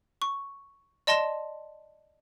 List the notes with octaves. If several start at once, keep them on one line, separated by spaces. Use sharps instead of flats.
C#6
D5 D#5 A5 C6 A#6 E7